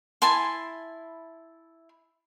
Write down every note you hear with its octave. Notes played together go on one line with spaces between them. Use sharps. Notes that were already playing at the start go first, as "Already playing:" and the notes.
E4 G#5 A5 C6